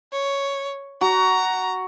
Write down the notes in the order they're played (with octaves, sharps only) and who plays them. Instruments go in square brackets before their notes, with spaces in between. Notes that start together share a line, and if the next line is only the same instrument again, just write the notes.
[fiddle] C#5
[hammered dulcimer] F#4 [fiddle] A#5